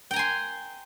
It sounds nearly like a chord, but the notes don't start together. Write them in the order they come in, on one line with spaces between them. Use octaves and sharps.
G5 A#5 G#5 C6